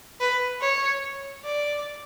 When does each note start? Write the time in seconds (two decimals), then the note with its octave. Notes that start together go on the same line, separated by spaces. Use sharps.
0.21 B4
0.61 C#5
1.44 D5